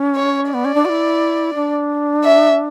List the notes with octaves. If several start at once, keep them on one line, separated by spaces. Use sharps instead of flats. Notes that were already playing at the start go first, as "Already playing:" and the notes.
Already playing: C#4
C#5
B3 D5
C#4
D4
F#4
E4
D4
E5